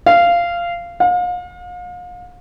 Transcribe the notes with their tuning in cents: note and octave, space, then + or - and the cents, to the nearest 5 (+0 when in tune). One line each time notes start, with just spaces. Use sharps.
F5 -15
F5 +40